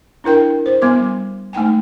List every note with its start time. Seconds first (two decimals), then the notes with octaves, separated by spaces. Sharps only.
0.24 D4 E4 A#4 G5
0.66 C5
0.82 G3 B3 C6 D6
1.53 A3 D#4 G5 G#5